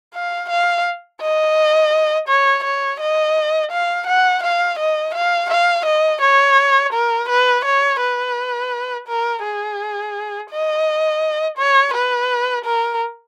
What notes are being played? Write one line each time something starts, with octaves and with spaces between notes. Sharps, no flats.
F5
F5
D#5
C#5
C#5
D#5
F5
F#5
F5
D#5
F5
F5
D#5
C#5
A#4
B4
C#5
B4
A#4
G#4
D#5
C#5
B4
A#4